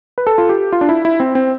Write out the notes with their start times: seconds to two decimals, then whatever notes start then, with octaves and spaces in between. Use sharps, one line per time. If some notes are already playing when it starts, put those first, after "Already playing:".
0.18 B4
0.27 A4
0.38 F4
0.49 G4
0.72 F4
0.81 D4
0.89 E4
1.05 E4
1.20 C4
1.35 C4